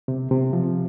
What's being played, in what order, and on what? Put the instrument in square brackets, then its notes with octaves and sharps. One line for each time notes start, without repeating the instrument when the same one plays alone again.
[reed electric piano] C3
C3
F3